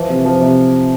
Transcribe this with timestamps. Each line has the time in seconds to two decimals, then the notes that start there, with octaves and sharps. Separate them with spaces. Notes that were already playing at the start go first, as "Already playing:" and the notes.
Already playing: E3 F3
0.09 C3
0.25 F3
0.42 C3